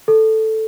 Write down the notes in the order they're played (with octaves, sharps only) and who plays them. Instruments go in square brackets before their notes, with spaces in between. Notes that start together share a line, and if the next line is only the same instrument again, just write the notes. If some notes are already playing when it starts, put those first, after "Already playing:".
[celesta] A4